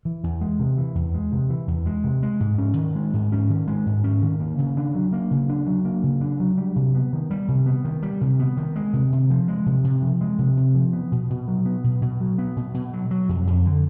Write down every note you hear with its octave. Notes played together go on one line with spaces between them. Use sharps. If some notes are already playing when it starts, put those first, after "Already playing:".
E3
E2
G#3
C3
E3
E2
G#3
C3
E3
E2
G#3
C3
G#3
G#2
C#4
D#3
G#3
G#2
C#4
D#3
G#3
G#2
C#4
D#3
A#3
C#3
D4
F#3
A#3
C#3
D4
F#3
A#3
C#3
D4
F#3
G3
C3
B3
D#3
G3
C3
B3
D#3
G3
C3
B3
D#3
G#3
C3
C3
F3
G#3
C3
C3
F3
G#3
C3
C3
F3
B3
B2
B2
F#3
B3
B2
B2
F#3
B3
B2
B2
F#3
F#3
F2
F2
D3